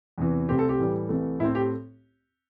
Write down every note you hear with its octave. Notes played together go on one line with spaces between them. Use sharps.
E2 C3 E3
C2 C3 A3 C4 G4
A4
G4
A2 E3 G3
C2 C3 E3 A3
A2 A3 C4 E4
G4